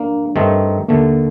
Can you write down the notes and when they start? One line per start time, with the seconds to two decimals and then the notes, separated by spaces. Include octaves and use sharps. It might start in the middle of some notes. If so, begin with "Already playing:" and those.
Already playing: A#3 D4
0.36 G2 D#3 A3 C4 D#4
0.88 D#2 D3 A3 A#3